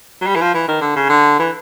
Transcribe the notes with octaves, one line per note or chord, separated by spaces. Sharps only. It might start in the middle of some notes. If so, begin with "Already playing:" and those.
F#3
G3
E3
F3
E3
D#3
D3
C#3
D3
E3